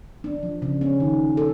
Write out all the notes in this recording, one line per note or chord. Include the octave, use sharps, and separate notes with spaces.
D4
F3
C#3
C#4
D#3
A4